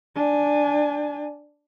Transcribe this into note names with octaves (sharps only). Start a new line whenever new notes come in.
D4 G#5